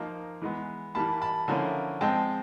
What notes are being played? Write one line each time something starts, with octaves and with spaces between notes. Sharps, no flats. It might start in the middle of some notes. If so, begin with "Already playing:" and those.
Already playing: F3 A#3 D#4 A#5 C6
E3 G#3 B3
E3 G3 A#3 A5 B5
A5 B5
D3 F3 A#3 C#4 E4 G#5 A#5
F3 G#3 C4 G5 A5